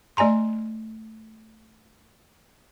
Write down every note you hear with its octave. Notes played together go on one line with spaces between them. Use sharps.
A3 D5 G#5 A#5 C6